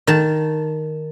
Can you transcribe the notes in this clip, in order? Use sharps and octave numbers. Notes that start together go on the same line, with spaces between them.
D#3 A5